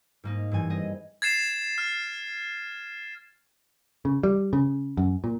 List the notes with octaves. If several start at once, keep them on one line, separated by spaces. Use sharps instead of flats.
G#2 A#3 D#4
G2 E3 G#5
C4 G#4 D#5
G#6 A6 C7 E7
F6
C#3
G3
C#3
F#2
A#2